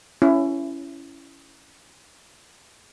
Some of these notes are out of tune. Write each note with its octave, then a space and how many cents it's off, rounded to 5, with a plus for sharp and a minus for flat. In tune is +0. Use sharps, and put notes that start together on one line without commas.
C#4 +10 E4 +20